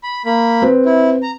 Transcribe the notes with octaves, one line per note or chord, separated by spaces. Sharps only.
B5
A#3 B5
C4 B4
E4
A#5